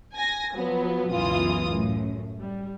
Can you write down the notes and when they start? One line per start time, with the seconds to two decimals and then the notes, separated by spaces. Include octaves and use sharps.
0.15 G#5 A#6
0.54 F3 F#3 B3
1.12 C#2 F#2 B2 E3 F4 D#6
1.68 F#2 A2
2.38 G3